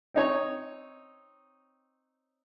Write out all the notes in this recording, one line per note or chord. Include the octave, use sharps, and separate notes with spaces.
C4 D#4 C#5